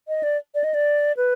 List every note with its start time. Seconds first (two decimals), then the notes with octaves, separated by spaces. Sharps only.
0.08 D#5
0.23 D5
0.55 D5
0.64 D#5
0.74 D5
1.17 B4